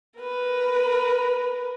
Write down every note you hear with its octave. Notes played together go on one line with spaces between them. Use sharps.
A#4 B4